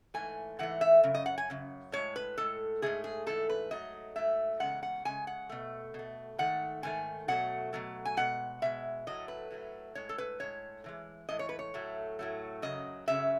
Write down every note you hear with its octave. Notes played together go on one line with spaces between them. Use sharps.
G#2 E3 A3 G#5
G#2 E3 A3 F#5
E5
F#2 C#3
D#5
F#5
G#5
F#2 C#3
A2 G#3 C#5
B4
A2 G#3 A4
G#2 E3 A3 G#4
G#4
G#2 E3 A3 A4
B4
G#2 F#3 A3 D#5
G#2 F#3 A3 E5
E2 C#3 G#3 F#5
F#5
E2 C#3 G#3 G#5
F#5
B2 A3
B2 A3
G#2 D#3 A3 F#5
G#2 D#3 A3 G#5
B2 F#3 A3 F#5
B2 F#3 A3
G#5
B2 G#3 F#5
B2 G#3 E5
A2 F#3 A3 D#5
B4
A2 F#3 A3
A2 G#3 C#5
A4
B4
A2 G#3 C#5
A2 E3 G#3
A2 E3 G#3 D#5
C#5
B4
C#5
A2 F#3 A3
A2 F#3 A3
F#2 C#3 F#3 D#5
F#2 C#3 F#3 E5